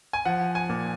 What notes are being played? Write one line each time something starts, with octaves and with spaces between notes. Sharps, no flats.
G#5
F3 F#5
G#5
A#2